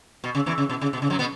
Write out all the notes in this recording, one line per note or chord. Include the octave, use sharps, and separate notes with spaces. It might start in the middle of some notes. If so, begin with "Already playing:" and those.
B2
C#3
E2 E3
C#3
B2
C#3
B2
C#3
F#2 F#3
B2 B3